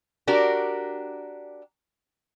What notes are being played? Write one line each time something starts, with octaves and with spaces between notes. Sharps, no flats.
D4 F#4 G4 A#4